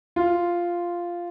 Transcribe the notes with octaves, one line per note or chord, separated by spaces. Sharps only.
F4